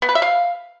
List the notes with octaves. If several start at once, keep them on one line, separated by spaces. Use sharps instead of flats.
B3
B4
E5
F5